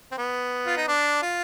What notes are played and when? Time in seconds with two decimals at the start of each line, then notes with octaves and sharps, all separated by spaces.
0.11 C4
0.18 B3
0.67 F4
0.76 D#4
0.88 D4
1.22 F4